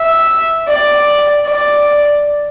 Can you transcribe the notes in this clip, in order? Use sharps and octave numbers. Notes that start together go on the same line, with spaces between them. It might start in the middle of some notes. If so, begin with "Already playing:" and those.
Already playing: E5
D5
D5